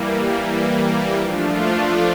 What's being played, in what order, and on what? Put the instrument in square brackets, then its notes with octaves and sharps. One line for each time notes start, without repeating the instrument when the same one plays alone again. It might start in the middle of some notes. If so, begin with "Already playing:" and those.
Already playing: [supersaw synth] E3 G3 A#3
F3 A3 D4 F4